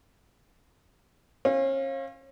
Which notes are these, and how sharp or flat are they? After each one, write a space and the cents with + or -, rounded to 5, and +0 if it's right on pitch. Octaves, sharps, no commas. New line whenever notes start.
C#4 -40 F5 +0